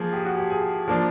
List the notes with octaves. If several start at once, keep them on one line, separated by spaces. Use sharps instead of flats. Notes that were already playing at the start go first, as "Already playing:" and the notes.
Already playing: F3 A#3 G#4
G4
F#4
G4
G#4
F3 A#3 D4